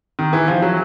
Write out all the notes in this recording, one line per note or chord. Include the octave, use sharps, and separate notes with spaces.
D#3
E3
F3
F#3